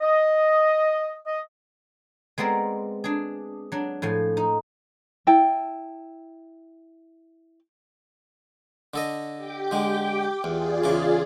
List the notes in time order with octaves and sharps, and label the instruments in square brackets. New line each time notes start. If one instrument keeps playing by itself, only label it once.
[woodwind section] D#5
D#5
[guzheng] G#3 B3 C4 A#4 D5
D4 G#4
F#3 D4
A2 F3 G#5
D#4
[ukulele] E4 G5 A5
[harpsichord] D3 A4 D#5
[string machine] G4 G5 D6
[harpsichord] D3 G#3
[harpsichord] E2 [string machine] F4 G#4 D5
[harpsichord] E2 C#3 D6